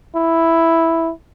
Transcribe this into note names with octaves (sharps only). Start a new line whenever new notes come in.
E4